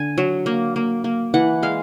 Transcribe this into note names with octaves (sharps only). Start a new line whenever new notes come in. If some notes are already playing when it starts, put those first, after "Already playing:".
Already playing: D3 G#5
F#3
A#3
A#3
A#3
E3 F#5
G#3 F5